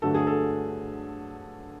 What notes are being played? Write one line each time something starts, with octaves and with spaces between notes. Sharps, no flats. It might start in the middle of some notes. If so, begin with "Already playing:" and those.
G2 D3 F#3 A3 A4
G#4
A4